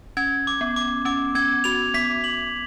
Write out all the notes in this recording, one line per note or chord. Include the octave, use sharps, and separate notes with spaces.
C#4 G#6
D6
B3
D6
C#4 D6
C#4 G#6
F#4 F7
B3 B6
F#7